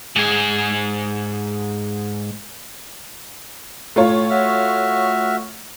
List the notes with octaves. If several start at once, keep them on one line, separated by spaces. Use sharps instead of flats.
G#2 G#4
A2 A3 F4 C#5
F#4 E5 F6